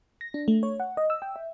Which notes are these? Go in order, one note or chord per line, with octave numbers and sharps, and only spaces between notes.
A#6
D4
A3
C#5
F#5
D#5
E6
G5
E5